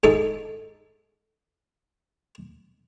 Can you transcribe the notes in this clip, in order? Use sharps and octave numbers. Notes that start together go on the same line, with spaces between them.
G#2 D#4 A4 D6